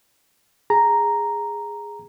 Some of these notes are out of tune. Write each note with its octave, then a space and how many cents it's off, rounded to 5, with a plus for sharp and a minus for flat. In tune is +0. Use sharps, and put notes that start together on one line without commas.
G#4 -5 A#5 +0